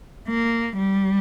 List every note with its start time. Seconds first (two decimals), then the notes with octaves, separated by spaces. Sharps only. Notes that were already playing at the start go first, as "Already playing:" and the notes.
0.28 A#3
0.77 G3